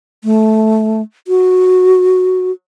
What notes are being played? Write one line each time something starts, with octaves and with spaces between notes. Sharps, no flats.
A3
F#4